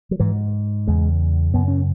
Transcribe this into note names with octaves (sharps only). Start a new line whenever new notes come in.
F#3
G#2 E3
E2 C#3 G#3
F#2 C#3 B3
C#4